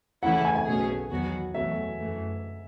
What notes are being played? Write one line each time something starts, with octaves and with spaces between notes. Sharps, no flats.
C#3 E3 A3 C#4 E4 F#5
G#5
G#5
B1 B2 A3 C#4 G#4
E2 D#3 F#3 B3 F#4
E2 B2 F#3 A3 E5
F#2 E3 A3